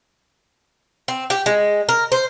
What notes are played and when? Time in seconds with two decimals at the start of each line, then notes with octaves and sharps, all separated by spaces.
1.08 C4
1.30 G4
1.46 G#3
1.89 A#4
2.12 C5